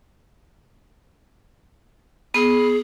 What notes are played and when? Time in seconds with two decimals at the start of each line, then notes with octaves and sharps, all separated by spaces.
2.34 B3 G#4